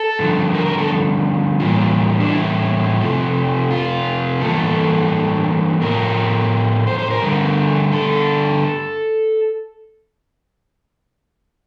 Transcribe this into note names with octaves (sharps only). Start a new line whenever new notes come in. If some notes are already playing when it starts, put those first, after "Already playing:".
Already playing: A4
G2 D3 F3
A#4
A#4
A4
A2 E3 G3 A#3 F4
D4
E4
C3 F3 A3
F4
G2 E3 A#3 A4
A2 F3 A3 A#4
C5
C5
A#4
G2 D3 A3
A4